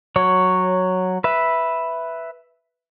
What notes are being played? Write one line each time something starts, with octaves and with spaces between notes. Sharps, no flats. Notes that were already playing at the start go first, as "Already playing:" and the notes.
F#3 C#5
B4 E5